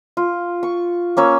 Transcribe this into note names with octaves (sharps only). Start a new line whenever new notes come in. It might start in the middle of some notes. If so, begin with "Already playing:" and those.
F4
C#6
A#3 C#4 C#5 E6